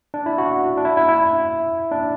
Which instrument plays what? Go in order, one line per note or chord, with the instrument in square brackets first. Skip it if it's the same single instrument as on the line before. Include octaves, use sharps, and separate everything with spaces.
[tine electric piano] D4
E4
F#4
D4
E4
E4
E4
D4